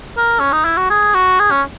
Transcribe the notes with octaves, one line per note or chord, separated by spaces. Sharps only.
A#4
C#4
D#4
E4
F#4
G#4
F#4
G#4
C#4